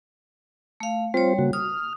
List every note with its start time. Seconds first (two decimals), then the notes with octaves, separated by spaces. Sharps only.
0.80 A3 F5
1.14 G3 C4 F4 C5 C#5
1.39 C#3 A#3 F#4
1.53 D#6 F6